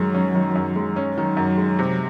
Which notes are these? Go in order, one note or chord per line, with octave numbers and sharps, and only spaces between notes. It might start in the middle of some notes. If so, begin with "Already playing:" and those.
Already playing: F#2 D#3 F#3 G#3 C#4
C#4
D#3
F#2
G#3
C#4
D#3 F#3
F#2
G#3
C3